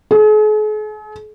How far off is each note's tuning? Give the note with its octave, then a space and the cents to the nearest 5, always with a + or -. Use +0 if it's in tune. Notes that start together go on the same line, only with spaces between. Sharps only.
G#4 +45